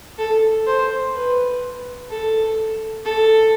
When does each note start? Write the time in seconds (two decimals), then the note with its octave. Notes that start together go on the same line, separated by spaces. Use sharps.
0.18 A4
0.67 C5
1.15 B4
2.10 A4
3.05 A4